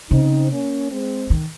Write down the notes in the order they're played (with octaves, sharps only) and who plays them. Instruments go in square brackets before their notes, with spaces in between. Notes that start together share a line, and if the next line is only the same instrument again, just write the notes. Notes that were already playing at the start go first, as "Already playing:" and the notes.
[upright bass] C#3 [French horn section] C4 D#4
[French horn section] A#3 C#4
G#3 C4
[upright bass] D#3